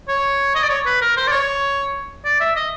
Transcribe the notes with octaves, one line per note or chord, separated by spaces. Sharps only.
C#5
D#5
D5
C#5
B4
A#4
C5
D5
C#5
D5
E5
D#5